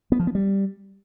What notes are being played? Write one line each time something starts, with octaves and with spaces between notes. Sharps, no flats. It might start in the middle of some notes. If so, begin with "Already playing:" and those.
B3
F3
B3
G3